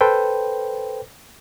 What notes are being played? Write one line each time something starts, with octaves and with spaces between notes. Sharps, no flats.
A4 B4 C5 G5